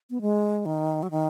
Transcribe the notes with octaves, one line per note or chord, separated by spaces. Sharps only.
B3
G#3
D#3
F#3
D#3